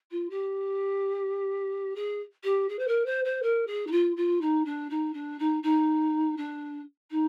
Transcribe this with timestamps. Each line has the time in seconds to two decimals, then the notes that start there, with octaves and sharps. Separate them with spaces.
0.11 F4
0.30 G4
1.95 G#4
2.44 G4
2.69 G#4
2.79 C5
2.88 A#4
3.05 C5
3.25 C5
3.42 A#4
3.67 G#4
3.87 D#4
3.91 F4
4.16 F4
4.41 D#4
4.65 D4
4.90 D#4
5.13 D4
5.39 D#4
5.63 D#4
6.37 D4
7.11 D#4